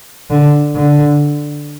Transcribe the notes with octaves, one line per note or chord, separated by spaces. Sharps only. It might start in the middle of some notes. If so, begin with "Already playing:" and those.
D3
D3